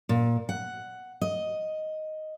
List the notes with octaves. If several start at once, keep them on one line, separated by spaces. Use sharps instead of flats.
A#2
F#5
D#5